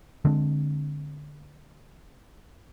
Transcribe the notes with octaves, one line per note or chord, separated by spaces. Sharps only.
D3 G#3 C4 D4